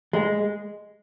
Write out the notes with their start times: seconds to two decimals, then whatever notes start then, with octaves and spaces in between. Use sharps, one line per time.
0.13 G#3